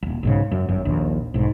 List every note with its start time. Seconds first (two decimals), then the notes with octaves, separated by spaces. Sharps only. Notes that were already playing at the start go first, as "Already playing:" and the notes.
0.03 D#1 G#1
0.23 B1 G#2 C#3
0.52 F#2
0.69 G1 F#2
0.85 A#1 D#2
1.34 B1 G#2